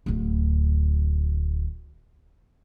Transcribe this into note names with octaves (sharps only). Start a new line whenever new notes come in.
D1 D2